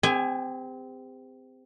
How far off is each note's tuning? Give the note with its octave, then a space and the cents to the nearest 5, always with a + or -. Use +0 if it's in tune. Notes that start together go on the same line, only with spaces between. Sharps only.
C4 -25 G4 +45 G#5 +0